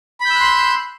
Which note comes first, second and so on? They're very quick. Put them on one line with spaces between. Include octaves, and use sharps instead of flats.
B5 G6 E6 F#6 C6